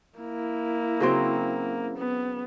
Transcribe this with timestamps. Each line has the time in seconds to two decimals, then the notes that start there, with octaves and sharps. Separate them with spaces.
0.18 A#3 E4
1.00 C#3 F#3 C4
1.98 B3